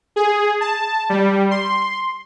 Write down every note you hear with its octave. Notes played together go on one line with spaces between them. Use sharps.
G#4
A5
G3
C6